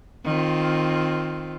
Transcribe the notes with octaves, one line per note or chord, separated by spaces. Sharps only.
D#3 C4 F4